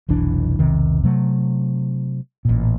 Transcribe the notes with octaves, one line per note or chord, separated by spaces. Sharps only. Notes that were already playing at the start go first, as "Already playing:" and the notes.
F1 B1 E3 D4
E1 B1 C3 D#3
C3 F#3 A3
A1 A#2